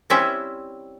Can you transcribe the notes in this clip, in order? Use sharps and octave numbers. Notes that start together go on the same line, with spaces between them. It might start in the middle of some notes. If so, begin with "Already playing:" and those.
G3 C4 C#4 E4 C5 E5